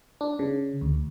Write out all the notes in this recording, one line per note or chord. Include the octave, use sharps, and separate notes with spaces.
D4
C#3
D2